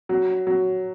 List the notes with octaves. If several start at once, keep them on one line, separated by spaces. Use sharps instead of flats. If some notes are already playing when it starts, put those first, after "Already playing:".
F#3
F#3